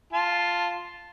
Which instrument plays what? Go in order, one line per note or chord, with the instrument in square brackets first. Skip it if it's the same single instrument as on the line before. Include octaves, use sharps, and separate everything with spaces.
[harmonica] F4 A5